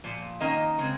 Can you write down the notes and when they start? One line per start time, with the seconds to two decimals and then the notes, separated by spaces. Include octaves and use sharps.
0.04 A#2 F3
0.40 D#3 A#3 C#4 D#5
0.78 C#3 G#3 C4